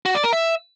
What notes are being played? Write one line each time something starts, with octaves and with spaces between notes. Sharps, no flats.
F#4
D5
A#4
E5